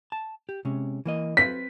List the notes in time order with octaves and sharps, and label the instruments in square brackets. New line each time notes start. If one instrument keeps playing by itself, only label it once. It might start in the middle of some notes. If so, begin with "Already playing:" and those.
[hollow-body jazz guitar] A5
G4
C3 G#3 C#4
E3 A#3 D#5
[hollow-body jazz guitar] C4 B4 [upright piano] B6